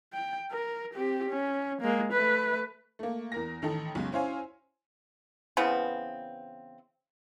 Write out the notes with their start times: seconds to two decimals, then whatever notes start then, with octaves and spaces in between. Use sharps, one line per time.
0.13 G5
0.51 A#4
0.94 C4 G4
1.29 C#4
1.82 G#3 A#3
2.12 A3 B4
2.99 A3 A#3
3.32 E2 A#4 A#6
3.62 A1 D#3 D#4 A4
3.95 B1 C#3 G#3
4.12 C#4 E4 C5 C#5 F5 G#5
5.57 C#3 E3 B3 C4